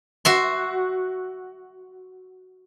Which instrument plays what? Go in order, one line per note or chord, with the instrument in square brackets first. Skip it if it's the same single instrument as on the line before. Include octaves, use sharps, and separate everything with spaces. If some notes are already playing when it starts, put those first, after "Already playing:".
[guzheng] F#4 E5 C6